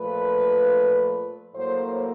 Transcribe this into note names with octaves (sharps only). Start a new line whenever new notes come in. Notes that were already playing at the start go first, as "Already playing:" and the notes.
Already playing: A#2 F3 A3 B4
A2 F#3 A#3 C5